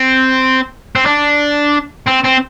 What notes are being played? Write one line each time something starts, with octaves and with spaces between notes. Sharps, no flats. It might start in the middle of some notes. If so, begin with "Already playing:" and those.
Already playing: C4
C4
D4
C4
C4